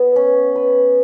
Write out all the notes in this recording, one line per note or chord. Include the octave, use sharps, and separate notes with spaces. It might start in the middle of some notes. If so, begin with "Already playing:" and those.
Already playing: B3
C#4
B4